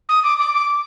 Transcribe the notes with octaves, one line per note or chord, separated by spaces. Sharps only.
D#6
D6
D6
D6